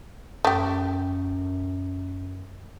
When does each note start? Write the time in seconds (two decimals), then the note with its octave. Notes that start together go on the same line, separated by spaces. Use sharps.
0.45 F#2 A3 G4